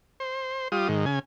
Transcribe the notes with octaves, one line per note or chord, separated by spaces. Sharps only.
C5
G3 F4 D#6
G#2 D#3
C#3 G#5